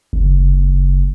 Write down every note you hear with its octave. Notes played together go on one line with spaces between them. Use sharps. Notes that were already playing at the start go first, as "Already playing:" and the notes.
F#1